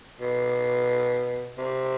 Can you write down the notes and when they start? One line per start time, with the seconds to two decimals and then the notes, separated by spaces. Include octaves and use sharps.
0.21 B2
1.58 C3